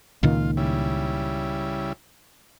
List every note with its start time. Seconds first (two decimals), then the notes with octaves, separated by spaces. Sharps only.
0.23 C#2 A#2 D#3 F4
0.57 C#3 G3 E4